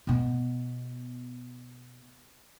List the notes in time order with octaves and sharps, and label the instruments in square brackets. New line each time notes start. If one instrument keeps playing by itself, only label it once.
[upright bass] B2 B3